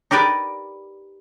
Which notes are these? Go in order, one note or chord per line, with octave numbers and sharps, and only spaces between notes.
D#4 G4 A#4 B4 D5